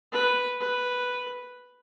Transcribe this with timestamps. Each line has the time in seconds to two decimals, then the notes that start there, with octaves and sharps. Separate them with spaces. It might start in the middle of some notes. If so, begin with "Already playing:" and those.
0.12 B4
0.60 B4